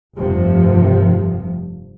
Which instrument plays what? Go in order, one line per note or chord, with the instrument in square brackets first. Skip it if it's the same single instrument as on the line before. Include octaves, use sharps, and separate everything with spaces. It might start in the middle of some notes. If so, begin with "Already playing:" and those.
[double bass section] F1 G2 C3 F3